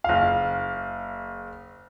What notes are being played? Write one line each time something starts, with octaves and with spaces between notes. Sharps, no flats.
F#1 F5